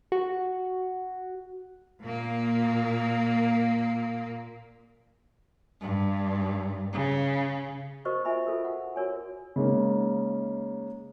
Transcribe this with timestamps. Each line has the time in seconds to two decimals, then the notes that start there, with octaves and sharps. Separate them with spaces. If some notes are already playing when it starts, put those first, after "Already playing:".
0.12 F#4
2.02 A#2 A#3
5.81 G2
6.93 C#3
8.05 F#4 A#4 C5 D#5 C#6
8.25 F4 E5 G#5 B5
8.47 F4 A4 A#4
8.64 F#5
8.96 F#4 A#4 C#5 G#5
9.56 C#3 G#3 A#3 D#4